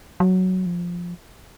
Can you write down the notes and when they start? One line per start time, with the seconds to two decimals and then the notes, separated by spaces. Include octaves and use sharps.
0.20 F#3
0.66 F3